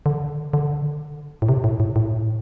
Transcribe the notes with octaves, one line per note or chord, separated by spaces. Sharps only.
D3
D3
A2
C3
A2
A2
A2